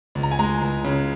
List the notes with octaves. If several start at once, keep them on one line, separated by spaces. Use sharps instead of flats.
C#2
A#5
G#5
G#3 A#5
C#2
C#3